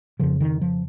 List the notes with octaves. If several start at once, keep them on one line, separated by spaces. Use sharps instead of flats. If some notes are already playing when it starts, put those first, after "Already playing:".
F2 C#3 F3
D#3
F3